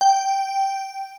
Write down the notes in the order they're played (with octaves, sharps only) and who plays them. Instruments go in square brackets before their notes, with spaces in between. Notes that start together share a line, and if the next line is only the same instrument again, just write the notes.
[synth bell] G5